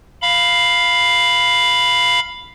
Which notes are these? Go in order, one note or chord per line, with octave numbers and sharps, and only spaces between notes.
F5 B5